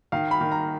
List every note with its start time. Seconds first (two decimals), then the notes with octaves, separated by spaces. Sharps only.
0.12 D#3 F5
0.31 B5
0.41 D#3
0.52 A#5